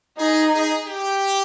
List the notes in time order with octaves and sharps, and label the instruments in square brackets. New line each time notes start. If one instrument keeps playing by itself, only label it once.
[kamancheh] D#4 [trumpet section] G#4
[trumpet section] G#4
G4